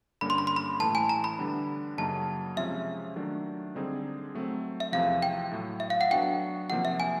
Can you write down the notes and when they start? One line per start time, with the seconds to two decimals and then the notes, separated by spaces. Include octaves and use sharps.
0.21 G2 D3 G3 A#3 C#4 B5
0.30 C6
0.38 B5
0.47 C6
0.56 B5
0.79 A2 E3 A3 A5
0.95 G#5
1.09 A#5
1.24 B5
1.38 D3 G3 B3 D4
1.98 F#2 C#3 F#3 A#3 D#4 A5
2.56 C3 F3 G#3 C#4 F4 E5
3.16 D#3 F#3 A3 D4
3.75 D3 G3 C4 D#4 G#4
4.35 F#3 A3 C4
4.80 E5
4.92 E2 C3 F3 F5
5.22 G5
5.51 A2 F#3 A3
5.80 E5
5.90 F5
6.01 F#5
6.11 F#3 B3 D4 F#4 G5
6.70 C3 F3 A#3 D#4 G4 F#5
6.85 E5
7.00 G#5